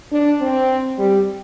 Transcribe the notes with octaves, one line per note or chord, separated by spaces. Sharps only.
D4
C4
G3